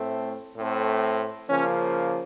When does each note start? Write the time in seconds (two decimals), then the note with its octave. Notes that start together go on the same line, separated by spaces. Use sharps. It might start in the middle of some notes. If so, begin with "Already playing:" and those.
Already playing: A2 A3 C4
0.55 A2 A3 C4
1.49 C#3 F3 A#3 C#4